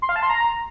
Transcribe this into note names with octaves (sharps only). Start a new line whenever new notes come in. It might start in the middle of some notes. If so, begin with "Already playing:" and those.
C6
F5
A5
C6
A#5